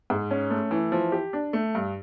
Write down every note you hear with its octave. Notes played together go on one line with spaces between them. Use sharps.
G#2
C#4
A3
E3
F3
G4
D4
A3
G2